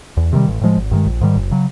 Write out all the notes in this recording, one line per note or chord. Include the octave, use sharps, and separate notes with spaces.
E2
C3 D#3 G3
A1
A2 F3 G#3
G#1
G2 D#3 G#3
A#1
G#2 D#3 G3
F#1
C#3 F#3